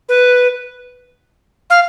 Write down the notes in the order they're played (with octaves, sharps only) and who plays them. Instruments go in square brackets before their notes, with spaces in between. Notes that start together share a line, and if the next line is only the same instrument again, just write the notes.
[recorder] B4
F5